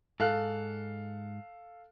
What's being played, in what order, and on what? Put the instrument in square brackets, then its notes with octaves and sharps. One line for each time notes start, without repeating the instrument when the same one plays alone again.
[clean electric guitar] G#2 [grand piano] A4 F5 F#6